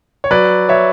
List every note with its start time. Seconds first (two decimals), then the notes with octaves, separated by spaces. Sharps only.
0.24 C#5
0.31 F#3 B4 D5
0.69 C#5 E5